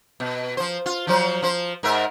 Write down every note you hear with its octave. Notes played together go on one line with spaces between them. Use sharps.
B2
F3 C5
F4
F3 F#3 C5
F3 C5
G#2 A#4 E5